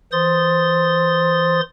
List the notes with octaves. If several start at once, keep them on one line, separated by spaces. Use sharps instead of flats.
E3 C5 C6 D#6 A6